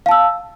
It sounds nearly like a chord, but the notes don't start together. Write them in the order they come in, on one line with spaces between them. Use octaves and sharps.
F5 A5 E6